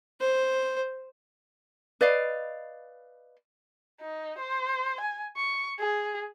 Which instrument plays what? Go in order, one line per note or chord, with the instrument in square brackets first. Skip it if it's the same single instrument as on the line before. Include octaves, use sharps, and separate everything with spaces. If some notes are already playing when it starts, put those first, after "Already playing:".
[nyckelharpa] C5
[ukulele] B4 D5 D#5 F5
[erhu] D#4
C5
G#5
C#6
G#4